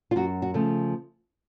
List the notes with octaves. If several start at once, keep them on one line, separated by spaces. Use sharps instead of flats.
F4
F#2 F#4
F#4
C#3 F3 A3